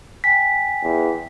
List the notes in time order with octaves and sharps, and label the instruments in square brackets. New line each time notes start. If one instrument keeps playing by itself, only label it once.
[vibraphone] G5 G#5 [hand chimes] B6
[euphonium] E2